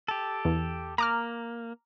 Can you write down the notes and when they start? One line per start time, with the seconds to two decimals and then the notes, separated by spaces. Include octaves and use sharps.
0.08 G4 A4
0.45 E2
0.98 A#3 A#5 D6 F6